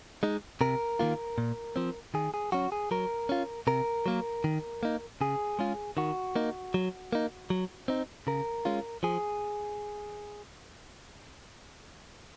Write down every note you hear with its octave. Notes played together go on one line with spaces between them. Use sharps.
G#3 D#4
C3 A#4
D#3 A#3 F4
A#2
F3 C4
D#3 G#4
G#4
F#3 C#4 F#4
G#4
F#3 A#4
C#4 F4
C3 A#4
F#3 A#3
D#3
A#3 D#4
C#3 G#4
G#3 C#4 F4
D#3 F#4
A#3 D#4
F#3
A#3 D#4
F#3
C4 D#4
C#3 A#4
G#3 C#4 F4
F3 G#4